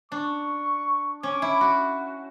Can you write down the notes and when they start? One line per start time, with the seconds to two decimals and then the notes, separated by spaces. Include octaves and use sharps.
0.11 D4 C#6
1.23 C#4 D6
1.42 E4
1.61 F#4